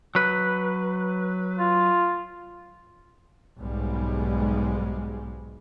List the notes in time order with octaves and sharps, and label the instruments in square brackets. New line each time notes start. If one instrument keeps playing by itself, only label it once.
[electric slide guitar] F#3 B4
[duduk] F4
[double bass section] B1 G#2 G3 G#3